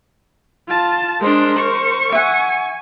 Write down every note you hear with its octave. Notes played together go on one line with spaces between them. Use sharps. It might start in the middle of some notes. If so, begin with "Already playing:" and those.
F4 A5
G#3 D4 A#4 C5
C#6
E5 F#5 G#5